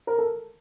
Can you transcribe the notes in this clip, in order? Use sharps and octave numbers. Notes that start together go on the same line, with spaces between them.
A#4
A4